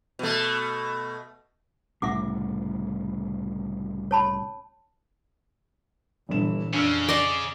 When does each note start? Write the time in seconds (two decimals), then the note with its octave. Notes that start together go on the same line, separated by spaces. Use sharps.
0.19 B2 A3
2.02 C2 A2 C#3 E5 F#5 D6
4.11 C#5 A5 B5
6.29 G1 G2 A#2 E3 E7
6.74 F2 C#3 D4 E6 F6
7.09 D5 D#5 C6 D7